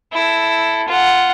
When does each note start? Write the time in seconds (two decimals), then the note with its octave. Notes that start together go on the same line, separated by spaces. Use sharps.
0.12 E4 A4
0.88 F4 F#5